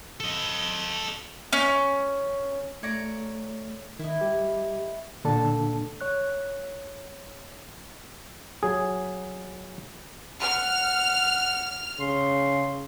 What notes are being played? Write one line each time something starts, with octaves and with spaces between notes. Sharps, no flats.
A4 D#5
C#4
A3 C#5 D5 A#5
D#3 E4 D#5
G3 G4
A#2 D3 A#3 D4 A4 A5
C#5 F#6
F#3 G#4
F#5 F6
C#3 C6